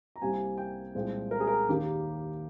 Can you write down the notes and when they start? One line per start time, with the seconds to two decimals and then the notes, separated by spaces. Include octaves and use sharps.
0.16 A#5
0.22 C2 C3 G3 A#3 G#5
0.58 G5
0.95 C2 A#2 F3 G#3
1.31 A#4
1.40 G#4
1.47 A#4
1.69 D#2 D#3 A#3 G4